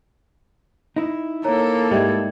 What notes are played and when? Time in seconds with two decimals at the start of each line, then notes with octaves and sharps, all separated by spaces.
0.96 D#4 E4
1.44 A#3 A4 C#5 A#5
1.91 G#2 G3 D#5 E5 G#6